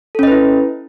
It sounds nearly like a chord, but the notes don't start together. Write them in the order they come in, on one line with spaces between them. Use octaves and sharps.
A4 C#4 D#5 B4 E4